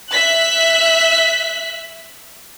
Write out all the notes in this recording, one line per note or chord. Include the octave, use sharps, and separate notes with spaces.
E5 F#6 B6